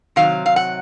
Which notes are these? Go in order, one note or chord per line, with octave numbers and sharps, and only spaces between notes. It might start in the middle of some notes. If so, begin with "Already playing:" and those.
C3 D#3 F#3 F5
F5
F#5